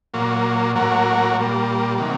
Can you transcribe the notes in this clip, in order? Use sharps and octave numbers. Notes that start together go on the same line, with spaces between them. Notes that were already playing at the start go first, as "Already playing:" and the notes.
A#2 F#3 A#3
A2 F#3 A#3 F#4 A#4
A#2 G3 A#3
C3 D#3 F#3 A#3